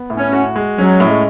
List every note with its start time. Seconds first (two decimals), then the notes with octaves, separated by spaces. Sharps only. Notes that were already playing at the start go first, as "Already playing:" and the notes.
Already playing: B3
0.10 A2
0.17 C#4
0.33 F#4
0.56 G#3
0.78 F#3 C#4
1.00 A2
1.08 G#3